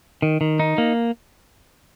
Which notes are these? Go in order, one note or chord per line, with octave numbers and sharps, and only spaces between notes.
D#3
D#3
D#4
A#3